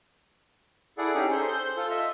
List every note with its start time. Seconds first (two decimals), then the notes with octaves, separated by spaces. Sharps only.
0.98 E4 G#4 A4 D5 F#5
1.15 C#4 D#4 G4 G#4
1.31 G#4 A4 C5
1.48 C5 G6
1.77 F4 A4
1.90 D#5 E5